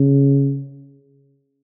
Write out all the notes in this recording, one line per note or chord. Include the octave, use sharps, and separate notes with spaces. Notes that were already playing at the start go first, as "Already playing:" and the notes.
Already playing: C#3